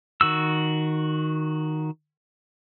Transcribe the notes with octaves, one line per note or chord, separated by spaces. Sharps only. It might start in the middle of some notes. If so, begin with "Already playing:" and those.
D#3 F#4 E6